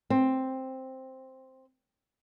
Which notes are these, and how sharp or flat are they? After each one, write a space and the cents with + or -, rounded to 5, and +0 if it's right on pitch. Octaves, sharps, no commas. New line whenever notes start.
C4 +5